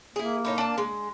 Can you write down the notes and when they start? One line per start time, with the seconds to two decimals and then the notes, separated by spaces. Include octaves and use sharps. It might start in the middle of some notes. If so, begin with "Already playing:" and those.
0.16 A#3 E4 G#4
0.45 A2 D#4 C#5
0.58 D4 A5
0.78 G#3